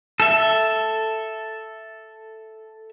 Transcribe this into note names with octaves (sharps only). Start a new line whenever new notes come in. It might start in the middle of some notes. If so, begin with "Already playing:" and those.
A4 E5